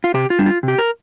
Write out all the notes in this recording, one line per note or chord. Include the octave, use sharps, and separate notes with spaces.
F4
C3 G4
F4
G3 D4
F4
C3
G4
A#4